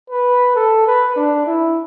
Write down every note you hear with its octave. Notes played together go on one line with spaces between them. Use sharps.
B4
A4
B4
D4
E4